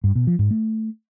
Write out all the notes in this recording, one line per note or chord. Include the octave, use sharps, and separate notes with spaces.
G2
B2
F3
G#2
A3